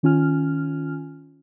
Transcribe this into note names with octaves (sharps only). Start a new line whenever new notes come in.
D#3 C#4 F4 G#5 F6